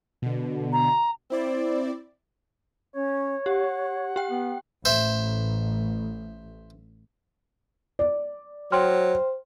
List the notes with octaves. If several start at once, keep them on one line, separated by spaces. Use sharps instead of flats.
B2 D3
A#5
C4 E4 C5 D5
C#4 C#5
G4 F#5
G4 G5
B3
A1 C5 E5
D5
F#3 C5 G5 C6 F6